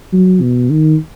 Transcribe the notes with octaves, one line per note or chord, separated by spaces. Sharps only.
F#3
B2
D#3